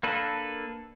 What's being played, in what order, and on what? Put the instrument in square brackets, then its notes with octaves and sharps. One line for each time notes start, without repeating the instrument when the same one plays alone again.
[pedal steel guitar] A#3 D4 A4 B4